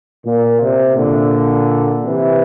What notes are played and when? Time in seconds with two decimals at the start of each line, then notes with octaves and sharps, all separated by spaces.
0.25 A#2
0.60 C3
0.95 A#2 D3
2.02 C3 E3